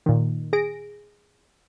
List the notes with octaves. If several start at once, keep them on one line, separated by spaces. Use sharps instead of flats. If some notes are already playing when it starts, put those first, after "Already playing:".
A#2 D#3
G#4 A#6 D7